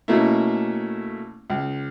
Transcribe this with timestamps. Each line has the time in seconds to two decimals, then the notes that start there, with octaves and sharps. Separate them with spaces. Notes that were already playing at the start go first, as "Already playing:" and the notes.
0.08 B2 A3 A#3 C#4 E4
1.50 C#2